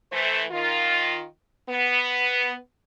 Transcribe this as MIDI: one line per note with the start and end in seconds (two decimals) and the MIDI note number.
0.12 0.43 52
0.12 0.43 57
0.12 0.43 72
0.51 1.26 51
0.51 1.26 65
1.70 2.55 59